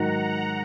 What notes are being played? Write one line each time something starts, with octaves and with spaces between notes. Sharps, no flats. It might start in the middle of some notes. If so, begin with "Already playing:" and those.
Already playing: G#2 D#3 F#3 F#5 A#5